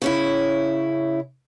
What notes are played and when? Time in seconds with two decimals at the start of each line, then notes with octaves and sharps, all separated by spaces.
0.02 C#3 C#4 E4